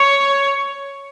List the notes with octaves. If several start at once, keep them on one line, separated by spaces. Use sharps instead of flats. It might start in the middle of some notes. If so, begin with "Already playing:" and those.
Already playing: C#5